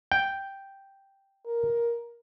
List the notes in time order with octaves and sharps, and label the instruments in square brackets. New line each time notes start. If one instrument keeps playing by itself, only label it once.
[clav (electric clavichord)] G5
[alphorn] A#4